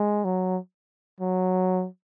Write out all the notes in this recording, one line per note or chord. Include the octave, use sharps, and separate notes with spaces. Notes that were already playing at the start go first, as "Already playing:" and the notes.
Already playing: G#3
F#3
F#3